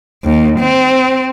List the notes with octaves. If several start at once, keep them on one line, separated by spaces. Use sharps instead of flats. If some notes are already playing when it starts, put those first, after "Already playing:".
D#2
C4